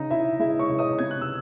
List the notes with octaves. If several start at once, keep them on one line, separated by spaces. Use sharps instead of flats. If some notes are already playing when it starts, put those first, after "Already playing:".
Already playing: C#3 D#4 D#5
C#3 E4 E5
G#3 E4 E5
C#5 C#6
C#3
D#5 D#6
C3 G#6
F#6
E6